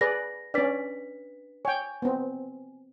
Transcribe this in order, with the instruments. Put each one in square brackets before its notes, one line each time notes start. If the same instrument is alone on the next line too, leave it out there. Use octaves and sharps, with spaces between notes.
[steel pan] G#4 B4 D5 [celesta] A#6
[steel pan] C#4 D5 [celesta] D4 B4 B6
[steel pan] C#5 G5 [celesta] G#5
[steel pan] B3 C4